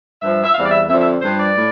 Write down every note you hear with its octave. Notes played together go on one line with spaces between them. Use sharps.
G2 F3 E5
E5
E2 C3 G3 F5
D5
E5
F2 D3 F3 E5
E5
G2 F3 C5
D5
A2